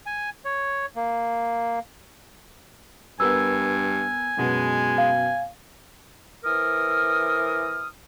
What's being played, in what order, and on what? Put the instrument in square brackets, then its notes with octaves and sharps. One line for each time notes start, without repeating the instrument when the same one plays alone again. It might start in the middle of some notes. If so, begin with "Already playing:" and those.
[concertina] G#5
C#5
A#3
[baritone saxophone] G2 [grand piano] B3 A#4 B4 [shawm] G#5 [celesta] E6
[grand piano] F#2 B2 B3 [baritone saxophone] G#3
[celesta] F5
[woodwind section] E3 A#4 C5 D#6 F6